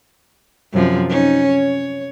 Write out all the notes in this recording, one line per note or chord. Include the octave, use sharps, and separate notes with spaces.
F#2 C3 F3
C#4 D#4
C#5